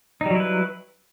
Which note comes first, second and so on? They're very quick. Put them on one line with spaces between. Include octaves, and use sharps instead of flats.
D#4 G3 F#3 E4 B4